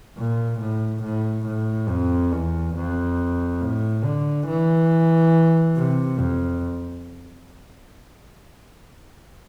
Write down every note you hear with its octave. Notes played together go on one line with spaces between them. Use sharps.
A#2
A2
A2
A2
F2
E2
F2
A2
D3
E3
C3
F2